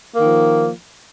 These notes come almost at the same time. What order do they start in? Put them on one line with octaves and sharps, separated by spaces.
A#3 D#3 F3